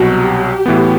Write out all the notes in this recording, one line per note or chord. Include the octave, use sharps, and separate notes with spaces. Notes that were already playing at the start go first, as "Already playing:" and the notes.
Already playing: C2 B2 F#3 F#4
G4
A2 E3 B3